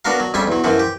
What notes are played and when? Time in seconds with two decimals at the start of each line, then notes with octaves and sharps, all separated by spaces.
0.05 B3 D4 F#4 A#4 F5
0.20 F#3
0.34 F2 G3 C#4 G#4 E5
0.47 E2 F#3
0.64 F#2 E3 F3 F#4
0.79 G4